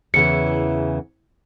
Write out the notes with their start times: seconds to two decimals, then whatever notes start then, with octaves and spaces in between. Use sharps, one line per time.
0.14 E2 C#3 E3 C#7